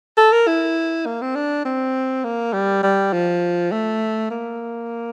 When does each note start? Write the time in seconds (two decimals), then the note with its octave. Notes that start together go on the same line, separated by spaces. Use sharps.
0.17 A4
0.32 A#4
0.47 E4
1.06 A#3
1.22 C4
1.35 D4
1.65 C4
2.24 A#3
2.53 G3
2.83 G3
3.13 F3
3.72 A3
4.31 A#3